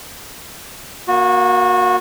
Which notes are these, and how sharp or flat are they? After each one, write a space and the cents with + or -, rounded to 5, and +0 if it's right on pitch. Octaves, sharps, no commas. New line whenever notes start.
A#3 +15 F#4 -25